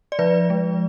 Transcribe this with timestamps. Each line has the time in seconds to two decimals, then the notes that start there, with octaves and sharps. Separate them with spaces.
0.12 D5
0.19 F3 B4
0.50 G#3